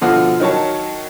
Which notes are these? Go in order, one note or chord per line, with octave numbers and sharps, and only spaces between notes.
B2 D3 F3 F4 F#4
D#3 F#3 C#5 A5